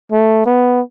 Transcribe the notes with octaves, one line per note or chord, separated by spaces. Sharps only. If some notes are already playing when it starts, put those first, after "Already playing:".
A3
B3